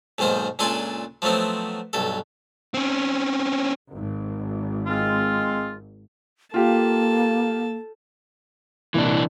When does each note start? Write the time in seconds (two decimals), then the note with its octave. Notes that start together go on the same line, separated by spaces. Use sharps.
0.18 B1 G#2 D#3 A#3 C5
0.59 C#2 A#2 D4 A4 G#5 C6
1.22 F3 F#3 A3 B3 C4
1.93 B1 G2 A4
2.74 C4 C#4
3.92 G#1
4.87 G#3 C4 F4
6.54 A#3 F4 G4 A4 A5
8.94 C2 A#2 E3 D4